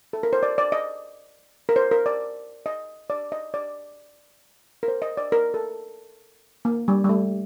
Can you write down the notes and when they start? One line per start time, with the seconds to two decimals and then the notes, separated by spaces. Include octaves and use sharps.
0.13 A4
0.23 A#4
0.33 C5
0.43 D5
0.58 D5
0.72 D#5
1.69 A#4
1.76 C5
1.91 A#4
2.06 D5
2.66 D#5
3.10 D5
3.32 D#5
3.54 D5
4.83 A#4
4.88 C5
5.02 D#5
5.17 D5
5.32 A#4
5.54 A4
6.65 A#3
6.88 G3
7.04 G3
7.09 A3